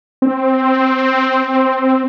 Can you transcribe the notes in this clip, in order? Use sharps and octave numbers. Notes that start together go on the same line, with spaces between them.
C4